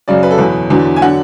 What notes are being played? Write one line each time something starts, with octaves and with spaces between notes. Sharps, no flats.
F#2 C#3 F#3 D5
B4
A4
E2 B2 F#3 B4
E2 D3 F#3
G#5
D3 F#3 F#5